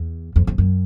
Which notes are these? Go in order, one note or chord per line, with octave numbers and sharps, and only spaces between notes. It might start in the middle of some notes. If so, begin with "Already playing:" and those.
Already playing: E2
F2
F2
F#2